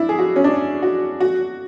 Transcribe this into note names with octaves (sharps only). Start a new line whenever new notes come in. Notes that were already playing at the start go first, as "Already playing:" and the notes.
Already playing: D4 E4
G#4
F#4
C#4
D4
F#4
F#4